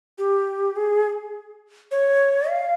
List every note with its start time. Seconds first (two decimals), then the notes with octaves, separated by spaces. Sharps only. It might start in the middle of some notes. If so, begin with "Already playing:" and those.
0.18 G4
0.76 G#4
1.91 C#5
2.49 F5